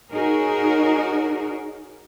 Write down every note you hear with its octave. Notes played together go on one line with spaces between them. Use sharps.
D#4 F#4 G#4 A#4 C#5